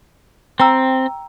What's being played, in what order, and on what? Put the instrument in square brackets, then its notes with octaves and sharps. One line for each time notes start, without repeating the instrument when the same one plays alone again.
[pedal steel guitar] C4 [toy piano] G5 A#5 E6